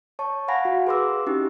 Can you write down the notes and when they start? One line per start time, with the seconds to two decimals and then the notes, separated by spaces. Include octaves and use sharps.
0.19 C#5 A5 C#6
0.48 F5 F#5 G#5 B5 A#6
0.65 F#4
0.87 G#4 B4 C6 D6 E6
1.26 C#4 D#4 E4 G4